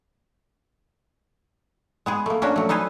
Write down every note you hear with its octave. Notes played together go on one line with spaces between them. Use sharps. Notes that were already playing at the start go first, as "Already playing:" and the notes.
G#3 B3 G#4
A3 A#3
C#4 D4 F#4 A#4 C5
F#3 A3
D#4 A4 B4 C5 G#5